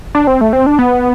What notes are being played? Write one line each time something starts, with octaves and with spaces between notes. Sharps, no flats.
D4
C4
A3
C4
D4
B3